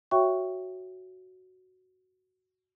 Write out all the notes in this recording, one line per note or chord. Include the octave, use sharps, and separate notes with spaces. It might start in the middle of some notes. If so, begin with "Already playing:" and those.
F#4 C#5 E5 G5 C#6